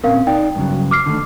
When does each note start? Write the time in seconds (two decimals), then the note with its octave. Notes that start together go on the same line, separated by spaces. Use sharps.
0.04 A#2 C4 C#4 A#4 F5
0.27 D#4 D5 G5
0.56 G2 C#3 F#3
0.91 D6 F6 C7
1.06 D3 D#3 A3